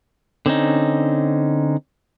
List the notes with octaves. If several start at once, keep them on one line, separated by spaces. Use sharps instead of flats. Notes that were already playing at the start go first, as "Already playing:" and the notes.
D3 C4 C#4 D#4